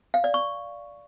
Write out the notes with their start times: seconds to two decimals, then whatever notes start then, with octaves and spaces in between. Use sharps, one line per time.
0.14 F5
0.24 D5
0.34 C#6